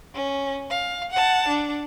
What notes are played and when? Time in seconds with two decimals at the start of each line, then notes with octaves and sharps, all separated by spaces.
0.14 C#4
0.70 F5
1.12 F#5 A5
1.48 D4